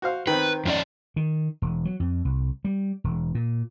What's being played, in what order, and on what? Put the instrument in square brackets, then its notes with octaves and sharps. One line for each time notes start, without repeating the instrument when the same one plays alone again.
[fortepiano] F#4 C5 F5
[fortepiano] D#3 C4 [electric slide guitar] B4
[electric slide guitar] F2 C#4 D5
[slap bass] D#3
E1
F#3
F2
C2
G3
E1
A#2